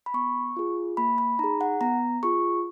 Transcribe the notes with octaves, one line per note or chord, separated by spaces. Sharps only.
B5
B3 C#6
F4 G#4
A#3 B5
B5
D#4 G#4 A#5
F#5
B3 A#5
F4 G#4 C#6